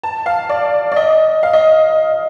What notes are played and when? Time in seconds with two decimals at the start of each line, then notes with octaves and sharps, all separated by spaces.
0.03 A5
0.26 F5
0.49 D5
0.92 D5
0.96 D#5
1.43 F5
1.53 D#5